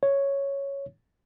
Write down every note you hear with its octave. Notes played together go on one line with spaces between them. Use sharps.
C#5